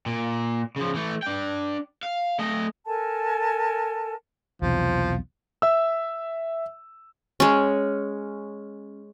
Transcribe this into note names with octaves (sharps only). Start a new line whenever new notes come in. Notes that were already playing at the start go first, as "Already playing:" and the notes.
A#2
C#3 F3
E3 A3
D4 G5
F5
A3 D#5
A4 A#4 G#5 A5
B1 E2 C3 F3
E5 E6
G#3 C#4